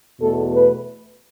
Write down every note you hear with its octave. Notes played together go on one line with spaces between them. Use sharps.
E2 B2 A3 A4
B4